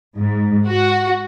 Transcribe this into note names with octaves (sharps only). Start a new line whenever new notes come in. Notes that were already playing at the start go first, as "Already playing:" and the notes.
G#2
F#4